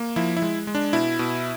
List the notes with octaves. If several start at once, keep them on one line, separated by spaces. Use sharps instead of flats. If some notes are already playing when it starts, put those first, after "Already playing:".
Already playing: A#3
F3 E4
E4
G#3
G#3
D4
B2 E4
B2